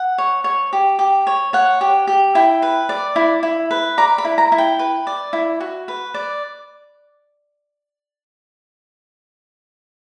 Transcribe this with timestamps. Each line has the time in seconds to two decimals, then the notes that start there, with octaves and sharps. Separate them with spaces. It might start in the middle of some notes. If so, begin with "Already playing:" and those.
Already playing: F#5
0.18 C#5
0.44 C#5
0.73 G4
0.99 G4
1.27 C#5
1.53 C#5 F#5
1.81 G4
2.07 G4
2.35 E4 G5
2.62 B4
2.89 D5
3.16 E4
3.43 E4
3.71 B4
3.98 D5 A#5
4.18 B5
4.25 E4
4.38 A#5
4.52 E4
4.58 G5
4.79 B4
5.07 D5
5.33 E4
5.60 F#4
5.88 B4
6.14 D5